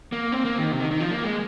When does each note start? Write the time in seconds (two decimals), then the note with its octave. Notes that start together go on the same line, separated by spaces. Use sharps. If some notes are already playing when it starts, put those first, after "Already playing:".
0.12 A#3
0.32 C4
0.45 A#3
0.58 D#3
0.72 C3
0.81 D#3
0.91 D#3
1.00 F3
1.11 A#3
1.24 G#3